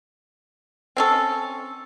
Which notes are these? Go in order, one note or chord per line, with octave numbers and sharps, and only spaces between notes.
C4 C#4 A4